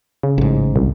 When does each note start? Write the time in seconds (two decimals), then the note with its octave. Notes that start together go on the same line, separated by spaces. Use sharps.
0.23 C#3
0.38 A1 G#2
0.76 C2